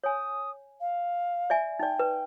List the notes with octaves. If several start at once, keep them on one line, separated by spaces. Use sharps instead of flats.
C#5 G#5 D#6
F5
D5 E5 G#5
D#4 D5 G5
B4